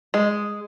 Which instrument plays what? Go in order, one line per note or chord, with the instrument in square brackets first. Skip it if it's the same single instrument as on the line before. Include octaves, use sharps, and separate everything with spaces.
[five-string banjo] G#3